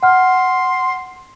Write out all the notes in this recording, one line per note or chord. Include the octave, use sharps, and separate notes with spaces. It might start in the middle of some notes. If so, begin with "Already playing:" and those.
F#5 C6 F6